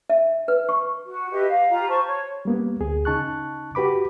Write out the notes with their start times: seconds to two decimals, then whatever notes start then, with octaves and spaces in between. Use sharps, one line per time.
0.10 E5
0.48 B4
0.69 C#6
1.05 F#4
1.31 G4 B4 D#5 E5
1.46 F5
1.68 F4 G4 A#5
1.88 C5 A5 C#6
2.07 C#5
2.45 G3 A#3 B3
2.80 D2 G#4
3.05 C#3 D#4 A5 C#6 F#6
3.75 F#4 G4 B4 B5 D6